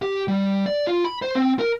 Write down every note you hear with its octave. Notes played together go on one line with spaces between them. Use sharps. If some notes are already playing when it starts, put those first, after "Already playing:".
G4
G3
D5
F4
B5
C5
C4
A#4